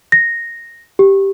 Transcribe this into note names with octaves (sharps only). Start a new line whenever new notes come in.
A#6
G4